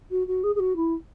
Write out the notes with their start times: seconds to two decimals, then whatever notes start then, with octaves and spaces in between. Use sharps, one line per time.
0.10 F#4
0.27 F#4
0.43 G#4
0.55 G#4
0.59 F#4
0.76 E4